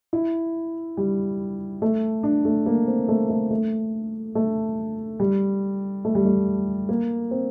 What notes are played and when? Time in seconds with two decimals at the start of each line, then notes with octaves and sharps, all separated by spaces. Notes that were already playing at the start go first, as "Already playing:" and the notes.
0.13 E4
0.97 G3
1.82 A3
2.23 D4
2.45 A3
2.66 A#3
2.87 C4
3.08 A3
3.29 A3
3.51 A3
4.35 A3
5.20 G3
6.05 A3
6.15 G3
6.25 A3
6.89 A#3
7.31 C4